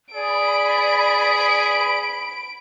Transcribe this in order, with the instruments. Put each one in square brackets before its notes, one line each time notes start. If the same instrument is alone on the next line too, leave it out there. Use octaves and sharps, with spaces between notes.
[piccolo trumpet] G#4 [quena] D5 [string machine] B5 [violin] D7